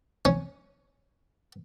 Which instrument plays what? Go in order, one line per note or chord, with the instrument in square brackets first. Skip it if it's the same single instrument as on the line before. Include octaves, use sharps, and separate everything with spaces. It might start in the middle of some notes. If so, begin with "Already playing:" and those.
[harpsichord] C#4